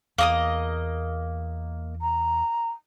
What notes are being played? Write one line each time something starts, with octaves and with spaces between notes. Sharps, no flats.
E2 A#3 D#5 D#6
A#5